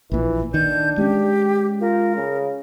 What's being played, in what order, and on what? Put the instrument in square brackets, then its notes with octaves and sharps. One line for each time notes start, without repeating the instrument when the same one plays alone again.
[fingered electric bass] A#1 A#2 [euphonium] E3
[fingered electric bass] D#3 [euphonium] D4 [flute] G6
[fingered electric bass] G#3 C#4 [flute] G4
[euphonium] F4 [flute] A#4
[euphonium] C#3